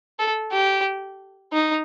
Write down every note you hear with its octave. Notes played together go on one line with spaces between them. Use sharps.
A4
G4
D#4